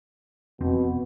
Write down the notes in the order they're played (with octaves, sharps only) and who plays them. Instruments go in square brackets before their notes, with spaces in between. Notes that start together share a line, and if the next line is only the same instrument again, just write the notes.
[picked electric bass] F1 F2 C4 [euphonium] B2